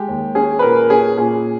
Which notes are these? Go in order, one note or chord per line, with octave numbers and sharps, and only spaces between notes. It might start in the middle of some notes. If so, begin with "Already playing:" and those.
Already playing: G#3 G4
D#2
C#4 G#4
B4
A#2 A#4
C#4 G#4
A#2 G#4